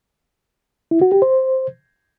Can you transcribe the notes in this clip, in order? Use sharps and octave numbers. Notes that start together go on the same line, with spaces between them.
E4
F#4
G4
C5